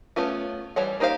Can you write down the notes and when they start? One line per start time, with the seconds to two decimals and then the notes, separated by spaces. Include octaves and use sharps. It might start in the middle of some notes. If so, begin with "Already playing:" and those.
0.16 A3 B3 C#4 F4
0.76 E3 G3 C#5 F#5
1.00 A#3 D#4 G4 C5 F5